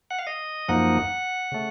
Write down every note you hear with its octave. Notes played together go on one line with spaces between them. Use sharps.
F#5
F5
D#5
F#2 F3 A#3 D#4 F#5
C#3 A3